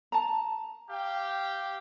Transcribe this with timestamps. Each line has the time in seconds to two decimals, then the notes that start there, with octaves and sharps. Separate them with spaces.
0.12 A5 A#5
0.90 G4 F5 G5